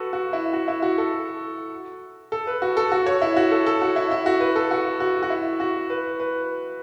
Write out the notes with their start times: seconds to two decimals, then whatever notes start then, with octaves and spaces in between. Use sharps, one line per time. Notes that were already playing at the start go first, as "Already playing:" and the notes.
Already playing: F#4 A4 B4
0.13 F#4
0.33 E4
0.53 F#4
0.68 E4
0.82 F#4
0.98 A4
2.32 A4
2.47 B4
2.62 F#4
2.77 A4
2.92 F#4
3.06 C#5
3.22 E4
3.37 F#4
3.51 A4
3.66 A4
3.82 F#4
3.96 E4
4.11 E4
4.26 F#4
4.40 B4
4.56 A4
4.71 F#4
5.00 F#4
5.23 F#4
5.30 E4
5.60 F#4
5.90 B4
6.20 B4